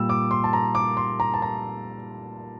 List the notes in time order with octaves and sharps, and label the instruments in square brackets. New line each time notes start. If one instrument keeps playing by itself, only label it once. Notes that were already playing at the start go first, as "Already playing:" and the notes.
Already playing: [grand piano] A#2 G3 E6
D6
C6
A5
A#5
D6
C6
A#5
A5
A#5